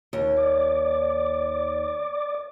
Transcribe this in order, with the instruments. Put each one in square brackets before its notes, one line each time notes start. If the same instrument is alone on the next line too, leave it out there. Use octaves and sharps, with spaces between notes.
[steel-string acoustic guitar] D#2
[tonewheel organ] D5 D6